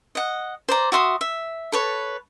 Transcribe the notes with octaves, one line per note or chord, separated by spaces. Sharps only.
D#5 F#5
C5 D5 A#5
F#4 E5 C6 D#6
E5
A4 B4 C#5